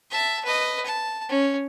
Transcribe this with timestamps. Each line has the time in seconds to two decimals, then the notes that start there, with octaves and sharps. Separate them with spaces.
0.10 E5 A5
0.44 B4 D#5
0.85 A5
1.29 C#4